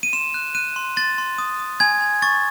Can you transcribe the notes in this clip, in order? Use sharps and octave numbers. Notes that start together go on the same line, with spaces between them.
D#7
C6 E7
F#6
F#6 D#7
C6
C6 A6
C6
D#6
D#6
G#5 G#6
G#5
C#6 A6